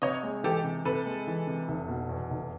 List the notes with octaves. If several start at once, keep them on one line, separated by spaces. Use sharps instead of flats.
C3 C#5 D#5
G#3
E3 G4 A4
C3
C3 A4 B4
G#3
E3
C3
F1
B2
E2
F1